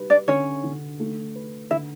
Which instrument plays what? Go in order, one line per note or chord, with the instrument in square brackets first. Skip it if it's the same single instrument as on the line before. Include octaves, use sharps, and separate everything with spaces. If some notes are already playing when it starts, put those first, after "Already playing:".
Already playing: [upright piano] G3 B4
[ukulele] D4 D5
[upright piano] D3 [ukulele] C#4 C#5
[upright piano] D3
A3
B4
[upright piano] D3 [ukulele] E4 E5